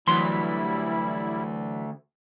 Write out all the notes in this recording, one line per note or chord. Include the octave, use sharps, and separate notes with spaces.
D2 E3 F#3 G3 E4 C6 B6